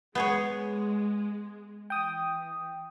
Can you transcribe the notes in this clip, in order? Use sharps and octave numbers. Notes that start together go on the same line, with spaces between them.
G#3 B3 G#4 C#5
E3 G5 D#6